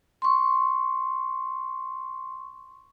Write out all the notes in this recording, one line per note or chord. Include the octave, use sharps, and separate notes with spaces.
C6 C#6